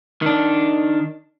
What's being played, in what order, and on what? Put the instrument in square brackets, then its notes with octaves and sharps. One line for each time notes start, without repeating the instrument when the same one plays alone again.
[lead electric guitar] D#3 D4